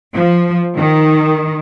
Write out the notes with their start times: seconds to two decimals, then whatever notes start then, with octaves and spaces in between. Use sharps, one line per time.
0.14 F3
0.75 D#3